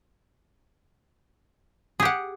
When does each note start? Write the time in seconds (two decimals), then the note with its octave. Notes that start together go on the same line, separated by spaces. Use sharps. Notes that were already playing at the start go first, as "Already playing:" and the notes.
2.00 G#4
2.02 G4
2.05 F#5